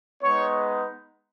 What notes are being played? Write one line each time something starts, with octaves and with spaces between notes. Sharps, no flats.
G#3 B3 D#4 C#5